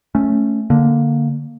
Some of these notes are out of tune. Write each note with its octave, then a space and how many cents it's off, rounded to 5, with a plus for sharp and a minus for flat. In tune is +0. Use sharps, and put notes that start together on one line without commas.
A3 +0 C#4 +0
D3 +0 A#3 +0